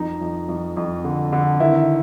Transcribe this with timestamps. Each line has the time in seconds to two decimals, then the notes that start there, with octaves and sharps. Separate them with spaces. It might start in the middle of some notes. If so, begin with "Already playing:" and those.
Already playing: F2 D#4
0.21 F2
0.49 F2
0.77 F2
1.04 D3
1.32 D3
1.60 D#3 E4